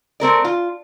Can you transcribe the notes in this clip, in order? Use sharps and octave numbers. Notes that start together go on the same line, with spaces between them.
A3 C4 A#4 D5
F4